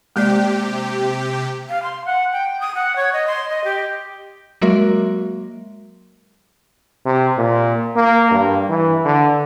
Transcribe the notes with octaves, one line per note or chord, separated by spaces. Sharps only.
C3 G#3 A#3 G4 D5
F5
C6
F#5
G5
D#6
F#5
C#5
D#5
C6
D#5
G4
F#3 G#3 A#3 F#4 A#4 E5
C3
A#2
A#3
G2
E3
D3